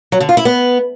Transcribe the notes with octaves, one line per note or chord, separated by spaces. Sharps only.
F#3
D3
F4
E4
B3